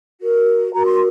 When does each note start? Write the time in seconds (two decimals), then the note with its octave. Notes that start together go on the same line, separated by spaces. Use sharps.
0.20 F#4 A#4
0.72 F#4 A#4 A#5
0.84 C6